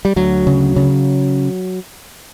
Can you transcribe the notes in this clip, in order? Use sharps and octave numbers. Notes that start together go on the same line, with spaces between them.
G3
D2 F#3
C#3
C#3